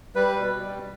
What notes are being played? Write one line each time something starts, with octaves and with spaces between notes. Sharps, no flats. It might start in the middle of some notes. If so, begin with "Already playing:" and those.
G3 B4
B2
G3